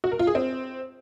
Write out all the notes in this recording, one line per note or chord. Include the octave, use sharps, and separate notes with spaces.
F#4
A#4
F4
G#4
C4